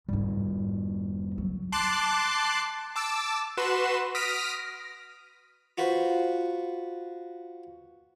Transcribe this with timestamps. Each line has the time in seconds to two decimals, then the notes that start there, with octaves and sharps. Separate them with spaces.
0.08 F1 G#2 G3 D#4
1.38 F#3
1.72 A5 C6 D6 F#6 A6 C7
2.96 A5 D6 E6
3.57 F#4 B4 C6 E7
4.15 D#6 F6 A#6 B6 D7
5.78 F4 F#4 B4 C5